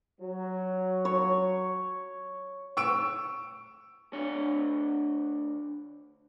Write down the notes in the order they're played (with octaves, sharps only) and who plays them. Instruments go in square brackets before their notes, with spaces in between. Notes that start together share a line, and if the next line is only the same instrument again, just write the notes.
[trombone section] F#3
[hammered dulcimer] C#5
[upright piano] C#6 E6 D7
[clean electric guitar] D2 D4 C#5